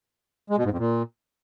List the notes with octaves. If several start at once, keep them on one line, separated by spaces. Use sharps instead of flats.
G#3
B2
G#2
F2
A#2